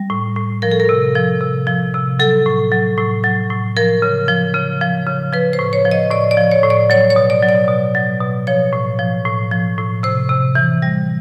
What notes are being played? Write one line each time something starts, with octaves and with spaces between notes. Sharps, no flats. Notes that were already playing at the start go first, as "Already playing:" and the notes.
Already playing: G3
A2
A2
F3 A#4
A4
A#4
C3
F3
C3
F3
C3
F#3 A4
A2
F#3
A2
F#3
A2
F3 A#4
C#3
F3
C#3
F3
C#3
F3 B4
C5
A2
C#5
F3
D#5
A2 D5
D5
F3
C#5
A2
D5
F#3 C#5
C#5
B2
D5
F#3
D5
B2
F#3
B2
F3 C#5
A2
F3
A2
F3
A2
C3 C5
C3
E3
G3